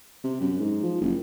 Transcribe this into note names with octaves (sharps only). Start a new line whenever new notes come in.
C3
F#2
G#2
F3
F#1